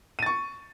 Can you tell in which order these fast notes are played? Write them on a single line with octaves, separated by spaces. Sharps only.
D#7 A6 C#6